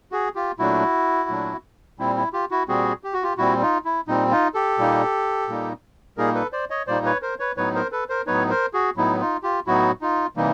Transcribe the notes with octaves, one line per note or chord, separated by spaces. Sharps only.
F#4 G#4
F4 G4
A#2 F#3 A3 D4 E4 F#4
A#2 F#3 A3 D4
A#2 G3 C4 E4
E4
F4 G4
E4 F#4
A#2 G3 C4 F#4 G#4
G4
F#4
F4 G4
A#2 G3 C4 E4 F#4
D#4 F4
E4
A#2 G3 C4 D#4
D#4 F4
G4 A4
A#2 G3 A#3 D#4
A#2 G3 A#3 D#4
A#2 G3 A#3 D#4 G#4 A#4
A4 B4
C5 D5
C#5 D#5
A#2 G3 A#3 D#4 C5 D5
B4 C#5
A#4 C5
B4 C#5
A2 F#3 B3 D#4 B4 C#5
A#4 C5
A4 B4
A#4 C5
A2 F#3 B3 D#4 B4 C#5
A#4 C5
F#4 G#4
A2 F#3 B3 D#4 E4
D#4 F4
F4 G4
A2 F#3 B3 D#4 E4 F#4
D#4 F4
C3 E3 G3 A#3 D#4